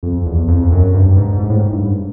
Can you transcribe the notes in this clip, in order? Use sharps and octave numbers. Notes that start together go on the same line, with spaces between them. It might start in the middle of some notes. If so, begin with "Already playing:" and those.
F2
E2
F2
F#2
G2
G#2
G#2
A2
G#2
G2